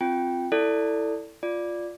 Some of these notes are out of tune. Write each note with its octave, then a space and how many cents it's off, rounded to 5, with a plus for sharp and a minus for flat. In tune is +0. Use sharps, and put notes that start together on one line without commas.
C4 +0 F4 +0 G5 +0
E4 +0 A4 +15 D5 -10
F4 +0 D5 +0